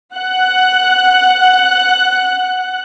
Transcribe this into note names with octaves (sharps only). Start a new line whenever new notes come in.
F#5 F#6